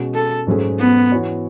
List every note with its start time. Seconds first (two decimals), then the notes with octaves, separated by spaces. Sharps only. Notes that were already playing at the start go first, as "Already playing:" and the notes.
Already playing: B2 G#3 C#4 F#4
0.14 A4
0.47 G#2 F#3 A3 C#4 G#4
0.80 B3
1.12 E3 B3 F#4 C#5